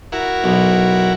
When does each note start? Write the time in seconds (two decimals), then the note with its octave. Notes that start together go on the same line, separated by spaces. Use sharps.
0.12 E4 F#4 A#4
0.44 B1